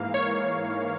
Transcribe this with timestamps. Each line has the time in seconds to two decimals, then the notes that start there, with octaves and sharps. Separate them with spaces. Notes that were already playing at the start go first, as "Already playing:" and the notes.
Already playing: G#2 E3 A#3 F5
0.14 C#5